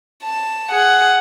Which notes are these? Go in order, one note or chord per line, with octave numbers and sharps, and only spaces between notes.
A5
G#4 F#5